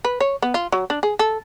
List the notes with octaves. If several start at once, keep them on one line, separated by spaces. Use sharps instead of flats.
B4
C#5
B3
F4
F#3
D4
G#4
A4